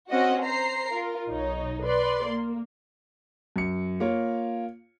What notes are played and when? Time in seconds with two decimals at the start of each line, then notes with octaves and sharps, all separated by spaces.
0.11 C4 C#4 F#4 D#5 F#5
0.44 C5 A#5 C7
0.90 F4 A#4
1.29 B1 D#4 C#5
1.85 B4 D5 C6
2.27 A#3
3.56 F#2 C#7
4.00 A#3 F4 C#5